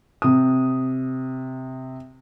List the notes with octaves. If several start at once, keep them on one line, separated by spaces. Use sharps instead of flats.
C3 D#6